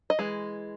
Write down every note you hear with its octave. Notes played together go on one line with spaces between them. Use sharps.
D#5
E3 G#3